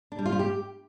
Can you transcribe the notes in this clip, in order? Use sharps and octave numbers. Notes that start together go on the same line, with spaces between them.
D4
G3
F4
G3
G4